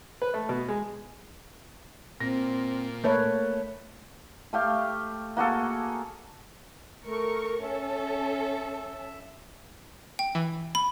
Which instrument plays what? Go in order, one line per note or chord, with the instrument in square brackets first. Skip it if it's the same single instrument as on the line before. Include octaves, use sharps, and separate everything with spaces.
[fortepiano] B4
A3
B2
G#3
[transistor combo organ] A#2 [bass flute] C4 [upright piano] A#6
[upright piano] A3 [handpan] A#3 B4 C#5 [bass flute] A#4
[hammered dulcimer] A3 G4 F5
A#3 F#4 G#4 A4
[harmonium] A3 [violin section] A#4 C#6
[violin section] C#4 A4 [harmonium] E5
[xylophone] G5
[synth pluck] E3
[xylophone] B5